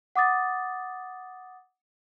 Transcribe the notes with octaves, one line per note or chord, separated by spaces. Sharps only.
F#5 D6 D#6 A6